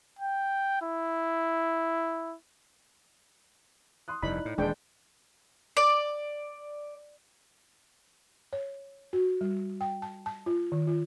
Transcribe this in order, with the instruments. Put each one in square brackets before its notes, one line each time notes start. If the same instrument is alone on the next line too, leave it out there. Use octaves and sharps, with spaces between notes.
[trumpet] G5
E4
[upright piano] C6 D#6 F#6
[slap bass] F1 G2 [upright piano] D#4 E4 D5 [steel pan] B5
[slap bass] A2
[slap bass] D#1 E3 [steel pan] G#3 D4 G5
[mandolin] D5
[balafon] C#5
F#4
G3
G5
A5
A5
F4
D#3
F4